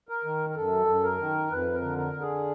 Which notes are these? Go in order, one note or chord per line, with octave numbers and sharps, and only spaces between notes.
A#4
D#3
A#4
F#2 A4
F#2
A#4
D#3
F2 B4
A#4
D3
A#4
D3
G#4